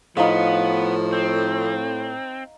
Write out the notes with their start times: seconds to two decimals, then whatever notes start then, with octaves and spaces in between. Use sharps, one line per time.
0.17 A2 F3 B3 D#4 F5
1.13 C4